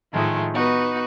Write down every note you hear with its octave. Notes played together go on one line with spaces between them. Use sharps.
A2 D#3 F3 G#3 A3
B3 D#4 F#4 B4